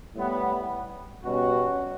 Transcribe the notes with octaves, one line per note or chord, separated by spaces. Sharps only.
A2 G3 B3
B2 G3 C#4 F#4